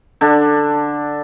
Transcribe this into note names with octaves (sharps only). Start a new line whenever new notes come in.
D3 D4